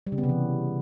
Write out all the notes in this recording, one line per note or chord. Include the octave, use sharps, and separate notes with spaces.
G3
C#3
B3
C3
E3